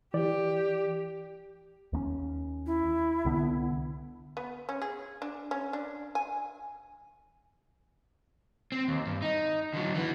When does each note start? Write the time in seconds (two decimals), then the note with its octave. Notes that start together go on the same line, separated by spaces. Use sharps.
0.14 E3 G4 D5
1.93 D#2 A#3 C#4
2.66 E4
3.25 C2 D3 B3
4.37 B3
4.69 C#4
4.82 G#4
5.22 D4
5.51 C#4
5.73 D4
6.15 G#5
8.72 C4
8.88 D#2
9.07 G2
9.22 D#4
9.74 D3 F#3
9.95 E3 B3